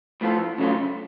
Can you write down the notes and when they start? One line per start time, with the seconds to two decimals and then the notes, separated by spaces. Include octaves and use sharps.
0.21 A2 F3 B3 F4 A4
0.58 C#3 F#3 A3 C#4 F4